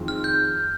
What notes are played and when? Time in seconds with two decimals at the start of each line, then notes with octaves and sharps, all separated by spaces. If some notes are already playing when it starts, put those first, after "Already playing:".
Already playing: F2 D#3 G#3 C4 F4
0.08 F6
0.24 G6